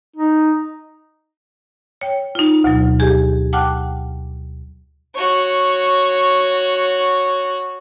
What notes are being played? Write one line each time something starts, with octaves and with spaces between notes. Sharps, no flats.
D#4
C#5 G5
D#4 F4
D2 B2 F#3
G4 G#4 G#5
F#5 G5 A5 D6 F6 F#6
F#4 C#5